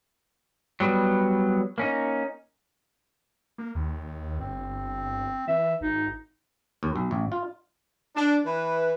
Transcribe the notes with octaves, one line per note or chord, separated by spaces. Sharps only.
F#3 G3 B3
A#3 C#4 D#4
A#3
D#2
G1 C4
E3 E5
G#1 D#4
D#2
B1
A1
F4
D4
E3 B4